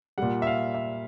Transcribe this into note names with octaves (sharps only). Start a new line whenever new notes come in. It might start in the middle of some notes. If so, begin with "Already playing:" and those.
A#2 G3 F#5
E5
F5
E5